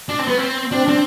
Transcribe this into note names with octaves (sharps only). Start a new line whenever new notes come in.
D4
C4
B3
C4
C4 D4
C4 D4